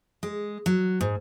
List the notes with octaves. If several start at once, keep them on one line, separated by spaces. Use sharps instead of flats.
G#3
F#3
G#2